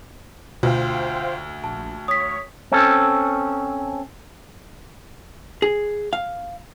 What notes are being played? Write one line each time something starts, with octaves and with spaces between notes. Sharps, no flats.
D2 B2 F4 C5 F5 G5
A#1 A5
C#5 D#6 B6
C4 C#4 A4
G#4
F5